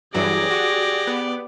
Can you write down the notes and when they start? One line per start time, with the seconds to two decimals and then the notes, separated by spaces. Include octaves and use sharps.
0.14 G2 E3 F#3 G4 G#4 D5 A#6
0.51 F#4
1.07 B3